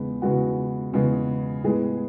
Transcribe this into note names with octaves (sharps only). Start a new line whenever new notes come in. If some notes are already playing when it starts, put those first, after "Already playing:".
Already playing: E2 C#3 G#3 B3
E2 C#3 G#3 B3 F#4
E2 C#3 G#3 B3
A2 G#3 B3 G#4